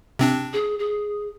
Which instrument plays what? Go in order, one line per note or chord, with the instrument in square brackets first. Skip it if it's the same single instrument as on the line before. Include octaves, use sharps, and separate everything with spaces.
[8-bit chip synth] C3 C4 D4
[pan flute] G#4
G#4